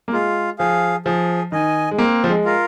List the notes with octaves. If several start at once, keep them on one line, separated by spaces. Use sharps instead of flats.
A#3
G#3 F4
F3 G#4 F5
F3 G#4
D#3 D#5 G#5
G#3
A#3 C4
F3
G#3
F4 A#4